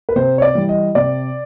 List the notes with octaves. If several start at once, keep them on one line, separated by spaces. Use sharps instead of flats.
B4
C3 C5
C#5
D5
E3 G3
D#5
C3 D5